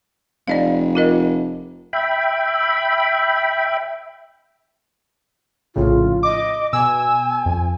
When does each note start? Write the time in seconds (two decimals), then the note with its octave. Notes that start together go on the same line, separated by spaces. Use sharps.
0.48 F1 D5 D#5 F5
0.95 F4 A#4 D#5
1.93 E5 G5 B5
5.76 A#1 A2 C#3 F4
6.23 D#5 D6
6.73 B2 G#5 E6
7.46 F2